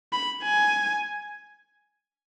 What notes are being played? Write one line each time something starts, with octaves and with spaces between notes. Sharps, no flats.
B5
G#5